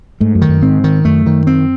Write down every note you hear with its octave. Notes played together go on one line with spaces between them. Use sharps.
G#2 A3
F#2
D#3
F#2
G#2 C4
D#3
F#2 A3
D#3
C4